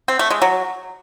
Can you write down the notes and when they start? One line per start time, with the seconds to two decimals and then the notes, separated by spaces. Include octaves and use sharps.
0.08 C4
0.19 A3
0.30 G#3
0.42 F#3